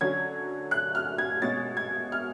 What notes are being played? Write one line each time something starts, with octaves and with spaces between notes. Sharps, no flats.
D3 F#3 C#4 G#6
F#6
F6
G#6
B2 G#3 C#4 A6
G#6
F6